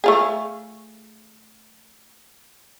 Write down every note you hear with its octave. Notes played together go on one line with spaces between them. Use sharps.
A3 F4 G#4